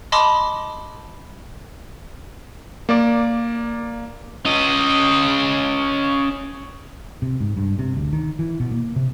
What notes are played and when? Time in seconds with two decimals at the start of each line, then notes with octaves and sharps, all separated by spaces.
0.12 D#5 A5 B5 C6 D6 D#6
2.89 A#3 D5 D6
4.45 C#4 D#5
7.22 C3
7.40 G#2
7.57 G2
7.79 C3
7.96 D2
8.13 D#3
8.39 E3
8.60 B2
8.71 A#3
8.96 C3